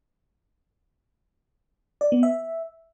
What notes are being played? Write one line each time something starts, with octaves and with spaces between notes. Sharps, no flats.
D5
B3
E5